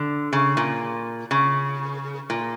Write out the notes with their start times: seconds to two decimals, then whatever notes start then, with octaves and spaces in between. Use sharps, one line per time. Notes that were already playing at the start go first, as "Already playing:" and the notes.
Already playing: D3
0.33 C#3
0.57 A#2
1.31 C#3
2.30 A#2